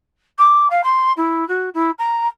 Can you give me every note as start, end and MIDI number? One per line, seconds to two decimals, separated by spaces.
0.38 0.68 86
0.70 0.81 77
0.84 1.12 84
1.17 1.47 64
1.48 1.69 66
1.74 1.91 64
1.99 2.27 82